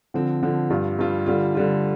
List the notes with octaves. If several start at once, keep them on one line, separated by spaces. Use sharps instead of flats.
D3 F3 C4
D3 F3 C4
G2 G3 F4
G2 G3 F4
D3 G3 F4
D3 G3 F4